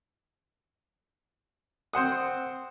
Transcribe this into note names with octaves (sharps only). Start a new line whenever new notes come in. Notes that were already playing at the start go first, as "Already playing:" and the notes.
C4 C5 F#5 D#6